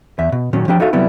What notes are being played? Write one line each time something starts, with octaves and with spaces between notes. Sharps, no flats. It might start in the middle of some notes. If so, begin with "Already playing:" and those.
E2 E5
B2
A#2 D#3 F#3 C#4
F3 D4 G4 G5
D#4 F#4 A4 E5 F5
C3 F#3 G3 B3 E4